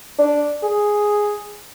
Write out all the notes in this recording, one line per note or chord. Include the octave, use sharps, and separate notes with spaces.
D4
G#4